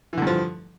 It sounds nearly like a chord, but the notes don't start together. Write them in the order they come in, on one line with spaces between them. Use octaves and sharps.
E3 D3 G2 F3